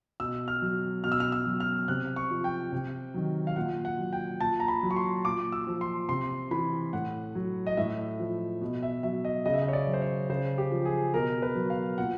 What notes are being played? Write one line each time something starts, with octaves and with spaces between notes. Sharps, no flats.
B2 E6
F6
F#3
B2 F6
E6
F6
E6
F#3
F6
C3 F#6
C#6
F3
G5
C3
D#3 F#3
F5
A#2 F#5
F#5
F#3
G5
A#2 A5
A#5
B5
F#3
C#6
C6
A#2 D6
E6
F3
C6
C3 C6
E3 B5
A2 F#5
F#3
D#5
A2 E5
F3
B2
E5
F#3 E5
D#5
C#3 D#5
E5
D#5
C#5
D5
F#3
C5
C#5
C#3 C5
G4
F3
G#4
B2 A#4
B4
F#3
F5
A#2 F#5